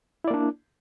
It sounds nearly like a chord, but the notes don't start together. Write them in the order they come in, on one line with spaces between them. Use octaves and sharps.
E4 D5 A#3 D4